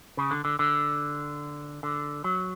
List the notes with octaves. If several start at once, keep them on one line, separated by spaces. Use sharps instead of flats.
C#3
D3
D3
D3
D3
F#3